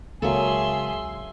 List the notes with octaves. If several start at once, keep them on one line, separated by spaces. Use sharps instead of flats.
C#2 F#3 A#3 G#4 A4 E5 C6